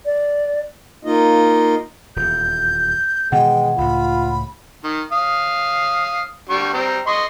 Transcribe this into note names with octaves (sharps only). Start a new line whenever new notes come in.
D5
A#3 D#4 F4 D#5
D#1 E2 G6
B2 D#3 E3 G#3 F#5 G5
C#2 A2 F4 B5
D#3
F5 D#6
D3 G3 C#6
G3 C4 A#5
D#5 C6 C#6